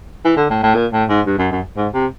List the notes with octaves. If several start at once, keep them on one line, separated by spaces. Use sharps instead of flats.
E3
D3
A2
A2
A#2
A2
G#2
G2
F#2
F#2
G#2
C3